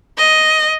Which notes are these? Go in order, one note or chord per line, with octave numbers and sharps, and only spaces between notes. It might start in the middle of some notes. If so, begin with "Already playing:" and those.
D#5